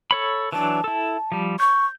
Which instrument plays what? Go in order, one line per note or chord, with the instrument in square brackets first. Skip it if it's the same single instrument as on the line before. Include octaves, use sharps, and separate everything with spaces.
[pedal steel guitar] A4 C#5 B5
[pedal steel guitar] E3 F#3 D4 [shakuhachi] A5
[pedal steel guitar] E4 A4
F3 G3
[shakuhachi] C#6 [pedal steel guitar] G6